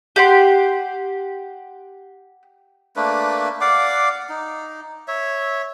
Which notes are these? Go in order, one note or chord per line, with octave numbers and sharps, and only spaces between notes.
G4 F#5 C6
A3 A#3 D4 B4
D5 F5 F#5 D6
D#4
C#5 E5